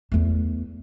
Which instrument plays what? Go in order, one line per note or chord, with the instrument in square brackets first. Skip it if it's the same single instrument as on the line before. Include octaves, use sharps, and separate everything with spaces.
[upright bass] E2 A3